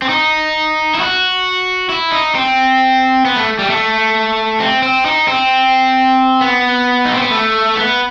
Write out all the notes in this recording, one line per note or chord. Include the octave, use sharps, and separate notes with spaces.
C4
D#4
E4
F#4
E4
D#4
C4
B3
A3
G3
A3
C4
C4
D#4
C4
B3
D#4
C4
B3
A3
B3